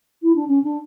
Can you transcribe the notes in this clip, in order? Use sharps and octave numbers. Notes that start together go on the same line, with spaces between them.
E4
D4
C#4
D4